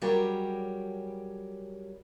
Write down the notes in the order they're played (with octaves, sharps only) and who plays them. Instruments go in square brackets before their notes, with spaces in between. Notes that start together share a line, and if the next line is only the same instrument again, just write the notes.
[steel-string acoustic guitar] F#3 G3 C#4 G4 G#4 A#4